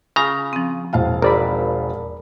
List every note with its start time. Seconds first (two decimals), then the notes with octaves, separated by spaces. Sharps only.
0.16 C#3 F4 A#5
0.53 F3 C4
0.93 E1 E4 C5 F5 A5
1.22 G#1 A#4 D5 B5